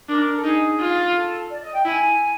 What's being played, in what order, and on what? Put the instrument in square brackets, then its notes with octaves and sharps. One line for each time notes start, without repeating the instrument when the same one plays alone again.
[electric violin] D4 [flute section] A#4
[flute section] A4
[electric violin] D#4 [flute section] G#4
[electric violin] F4
[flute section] A4
D5
D#5
G5
[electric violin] E4 [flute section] G#5